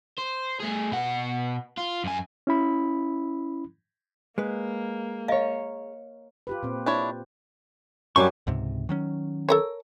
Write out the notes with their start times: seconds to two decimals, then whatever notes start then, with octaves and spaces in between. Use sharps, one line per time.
0.18 C5
0.60 A3 G#4
0.92 B2 F#5
1.78 F4
2.04 F#2 G#5
2.47 C#4 E4 B5
4.38 G#3 A#3 B4
5.28 A#4 C#5 D#5 F5
6.47 F4 G4 B4
6.63 A#2 C4
6.86 D4 E4 C#5
8.16 F#2 F#3 G3 C#6 D6
8.47 C#2 G#2 C3
8.89 D#3 F#3 C#4
9.49 A4 A#4 C#5